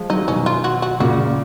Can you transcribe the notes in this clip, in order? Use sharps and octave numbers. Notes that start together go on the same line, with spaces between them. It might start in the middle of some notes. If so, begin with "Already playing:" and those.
Already playing: F3 G#3
D#3 F#3 D#4
B2 D#3 C#4
F4
F#4
F#4
A#2 C#3 F#4
A#2